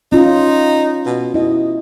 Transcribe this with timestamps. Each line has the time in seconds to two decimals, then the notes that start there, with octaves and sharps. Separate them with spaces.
0.12 C#4 D#4 F4
1.06 B2
1.34 B2 E4 D#5